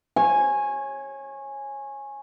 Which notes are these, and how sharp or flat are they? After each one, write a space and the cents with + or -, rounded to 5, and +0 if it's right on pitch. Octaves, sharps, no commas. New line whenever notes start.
C#5 -25 G#5 +0